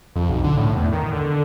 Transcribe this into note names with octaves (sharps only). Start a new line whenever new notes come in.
F2
B1
D3
A2
E2
D#3
D3
D3